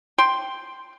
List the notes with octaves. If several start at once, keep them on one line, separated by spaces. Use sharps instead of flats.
G5 C6